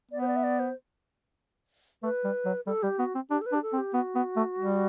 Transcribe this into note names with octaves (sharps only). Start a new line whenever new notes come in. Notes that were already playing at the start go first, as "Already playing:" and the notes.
B3 D5
C5
D5
E5
D5
C5
A3 B4
G3
F#3
G3 A4
G3 G4
B3 F#4
C4
D4 G4
A4
B4
D4 G4
A4
C4
G4
B3 F#4
B3
A3
G3